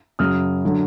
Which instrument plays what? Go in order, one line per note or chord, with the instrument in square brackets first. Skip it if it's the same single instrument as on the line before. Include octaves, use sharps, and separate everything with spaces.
[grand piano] F#2 C#3 F#3 D#6 F6
D3 F#3